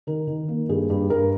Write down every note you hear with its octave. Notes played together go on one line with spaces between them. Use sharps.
D#3 A#4
D#3
A#3
G2 G#4
G2 G4
G2 A#4